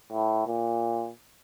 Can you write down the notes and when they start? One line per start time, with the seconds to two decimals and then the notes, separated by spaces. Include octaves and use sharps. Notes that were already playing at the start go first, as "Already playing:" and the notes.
0.12 A2
0.47 A#2